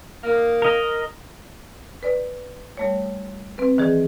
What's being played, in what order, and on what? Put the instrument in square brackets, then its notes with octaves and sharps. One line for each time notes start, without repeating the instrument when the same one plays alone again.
[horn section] D#3 A#3
[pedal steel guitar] A#4 D#5
[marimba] B4 D5
G3 A3 C#5
C4 B4
D#3 E3 G#4 D5